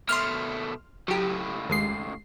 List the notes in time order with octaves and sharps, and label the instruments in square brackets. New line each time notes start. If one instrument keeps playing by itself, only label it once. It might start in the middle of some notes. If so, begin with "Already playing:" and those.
[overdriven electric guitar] B2 A3 [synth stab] C6 F6
[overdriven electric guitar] C#2 A2 [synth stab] F#3 G4
[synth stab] D#2 G#3 C7